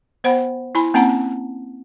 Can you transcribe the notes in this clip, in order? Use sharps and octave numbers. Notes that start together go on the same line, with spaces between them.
B3 C5 F#5 B5
E4 G#5 B5
A#3 C4 C#4 F#5 A5 A#5